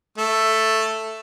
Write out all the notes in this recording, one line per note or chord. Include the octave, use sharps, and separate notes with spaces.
A3